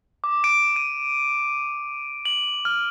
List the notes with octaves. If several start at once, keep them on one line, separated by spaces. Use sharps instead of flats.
D6
D7
D#7
F#7
F6